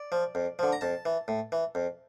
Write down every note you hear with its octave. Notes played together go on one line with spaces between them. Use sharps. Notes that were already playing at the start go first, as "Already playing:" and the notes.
Already playing: D5
F3
F2
D3 F3
A#5
F2 A5
E3
A2
E3
F2